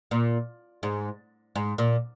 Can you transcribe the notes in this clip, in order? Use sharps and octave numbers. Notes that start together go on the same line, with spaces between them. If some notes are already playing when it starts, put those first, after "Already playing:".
A#2
G#2
G#2
A#2